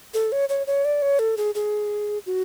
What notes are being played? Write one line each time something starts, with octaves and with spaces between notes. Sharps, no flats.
A4
C#5
C#5
C#5
D5
C#5
A4
G#4
G#4
F#4